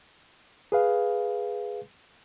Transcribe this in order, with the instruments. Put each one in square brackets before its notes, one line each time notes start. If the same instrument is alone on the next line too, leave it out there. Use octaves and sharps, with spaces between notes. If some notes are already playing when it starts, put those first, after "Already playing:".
[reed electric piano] G#4 B4 F5